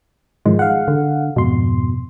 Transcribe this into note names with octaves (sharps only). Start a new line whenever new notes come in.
G#2 D#3 F3 G#3
F5 F#5
D3
F2 G#2 B2 C6